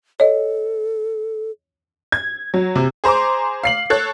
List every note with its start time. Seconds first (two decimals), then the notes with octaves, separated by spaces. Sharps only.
0.20 A4 C#5 D#5
2.12 G#6
2.54 F#3
2.76 C3
3.04 G#4 C5 A#5 C6 D6
3.63 F5 C7 F#7
3.90 A4 C#5 F#6